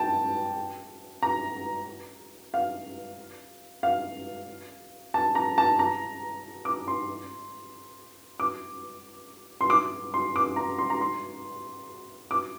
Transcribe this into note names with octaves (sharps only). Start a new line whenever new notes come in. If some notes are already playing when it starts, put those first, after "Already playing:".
Already playing: G5 A5
A#5
F5
F5
A5
A#5
A5
A#5
D6
C6
D6
C6
D6
C6
D6
A#5
C6
A#5
C6
D6